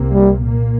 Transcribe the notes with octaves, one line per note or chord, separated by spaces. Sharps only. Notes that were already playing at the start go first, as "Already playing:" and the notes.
Already playing: C2 C3 A#3
G3
A#2 A#3